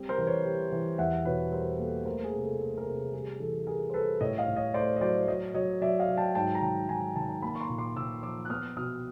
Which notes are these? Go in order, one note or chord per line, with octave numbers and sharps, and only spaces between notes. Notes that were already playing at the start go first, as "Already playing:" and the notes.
Already playing: G3 C4
A#4 C5
E3
B4 C#5
G3
E3
E2 E5 F#5
B2 B4 C#5
G3 A#4 C5
A#3 A4
A3 A#4 C5
G#4
C3
A4
A3 A4
G#4 A#4
C3
G#4
G3 G#4
E3 A4
G3 G#4 A#4
C5
G3 A4 B4
A2 C#5 D#5
D#5 F5
A2
C#5 D#5
A3 C5 D5
D#5
F#3 C5 D5
F#3 C#5 D#5
F#3 C#5 D#5
F#3 D5 E5
D#5 F5
F#3
G5 A5
G#2 G5 A5
A#5
D#3 G5 A5
D#3 G#5 A#5
D#3 A5
A#5
A#3 A5 B5
C#6
A#5 C6
A#2
C6 D6
A#2 D6 E6
F3 D6 E6
F#6
B3 D#6 F6
B2 D#6 F6